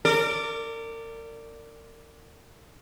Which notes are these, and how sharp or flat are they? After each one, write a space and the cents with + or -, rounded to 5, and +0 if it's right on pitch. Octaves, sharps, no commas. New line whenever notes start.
A#4 -35 D5 +0